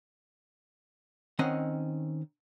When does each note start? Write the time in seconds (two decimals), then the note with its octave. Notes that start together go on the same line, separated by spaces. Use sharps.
1.39 D#3 C4 C#4 D#5 F#5